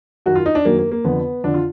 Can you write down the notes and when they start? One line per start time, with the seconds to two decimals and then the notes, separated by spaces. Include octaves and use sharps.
0.26 F#2 D#3 F#3 F#4
0.35 F4
0.46 D#4
0.55 D4
0.65 F#2 D#3 F#3 A#3
0.79 A#3
0.92 A#3
1.04 F2 D3 F3 B3
1.44 F2 D3 F3 D4
1.54 F4